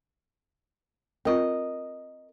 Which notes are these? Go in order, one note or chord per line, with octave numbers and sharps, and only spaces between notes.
C4 F4 A#4 D#5